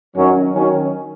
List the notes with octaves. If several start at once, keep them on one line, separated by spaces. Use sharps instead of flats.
F#2 D#3 F#3 C#4
D#3 F#3 C#4